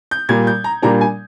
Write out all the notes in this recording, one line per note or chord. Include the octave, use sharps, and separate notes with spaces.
G6
A#2 G3 A#3 G#6
G6
A#5
A#2 G3 A#3 D4 A#5
G#5